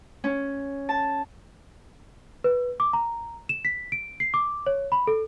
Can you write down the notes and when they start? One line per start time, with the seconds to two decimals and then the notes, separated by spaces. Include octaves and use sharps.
0.24 C#4
0.89 A5
2.44 B4
2.80 D6
2.93 A#5
3.49 E7
3.65 B6
3.92 D7
4.20 C7
4.34 D6
4.66 C#5
4.92 B5
5.07 A4